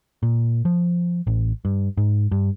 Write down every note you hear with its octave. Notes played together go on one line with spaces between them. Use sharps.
A#2
F3
A1
G2
G#2
G2